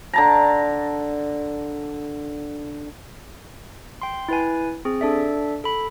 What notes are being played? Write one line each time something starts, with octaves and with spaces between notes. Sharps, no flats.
D3 A5 A#5
G5 C6
E4 B4 G#5
C4 G#4
D4 A4 D5 E5
A4 B5